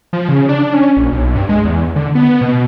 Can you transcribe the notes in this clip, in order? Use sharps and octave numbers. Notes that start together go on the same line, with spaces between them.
F3
C#3
D4
C#4
A#1
B1
G2
G#3
E2
D3
B3
B2